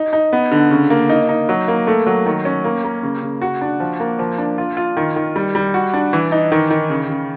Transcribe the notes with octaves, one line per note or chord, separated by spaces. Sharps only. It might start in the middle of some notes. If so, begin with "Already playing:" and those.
Already playing: D#4
D#4
B3
D3
C#3
A#3
D#4
D#4
F#3
A#3
A3
F#3
D#3
C#4
A#3
A#3
C#3
C#3
F#4
D4
F3
A#3
F3
D4
F4
F4
D#3
D#3
G3
G3
F#4
D4
E3
D#4
D#3
D#3
C#3
C#3